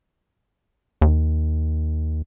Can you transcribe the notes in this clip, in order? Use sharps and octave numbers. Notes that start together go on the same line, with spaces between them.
D#2